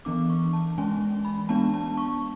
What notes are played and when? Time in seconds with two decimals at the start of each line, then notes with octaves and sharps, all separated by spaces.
0.05 E3 B3 D4 D6
0.30 C#6
0.53 A5
0.78 E3 G#3 C#4 G#5
1.25 B5
1.49 G#3 B3 D4 A5
1.74 A5
1.97 C#6